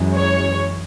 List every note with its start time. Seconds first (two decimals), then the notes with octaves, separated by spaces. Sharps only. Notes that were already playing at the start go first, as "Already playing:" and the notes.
Already playing: F#2 E3 G#3
0.15 C#5